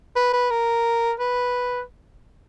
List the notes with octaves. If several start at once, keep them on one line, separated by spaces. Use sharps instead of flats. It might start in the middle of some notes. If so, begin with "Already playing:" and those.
B4
B4
A#4
B4